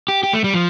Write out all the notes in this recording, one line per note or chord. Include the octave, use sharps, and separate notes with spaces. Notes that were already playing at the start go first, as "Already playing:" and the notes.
G4
G4
A3
G3
F3